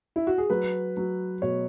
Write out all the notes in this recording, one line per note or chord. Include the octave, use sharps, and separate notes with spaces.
E4
F#4
G#4
F#3 B4
F#3
B2 C#5